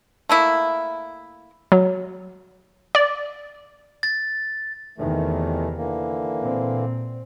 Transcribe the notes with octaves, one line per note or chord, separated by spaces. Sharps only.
A3 A#3 E4
F#3
D5
A6
E2 C3 D#3 E3 A3
D3 E3 A#3
A#2 C4